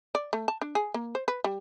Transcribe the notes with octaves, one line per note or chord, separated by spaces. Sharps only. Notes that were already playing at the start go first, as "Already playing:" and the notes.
D5
A3
A5
D4
G#4
A#3
C5
B4
G3